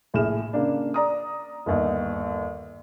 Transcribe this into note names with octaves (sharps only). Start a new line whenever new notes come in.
A#1 A2 G#4 F6 E7
C#3 A#3 D4
D5 A#5 D#6
G1 D#2 D#5